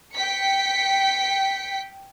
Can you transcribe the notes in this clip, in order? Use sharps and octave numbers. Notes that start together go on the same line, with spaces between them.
G5 B6 C#7